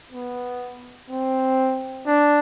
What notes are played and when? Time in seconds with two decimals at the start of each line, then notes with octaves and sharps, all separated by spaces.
0.13 B3
1.10 C4
2.07 D4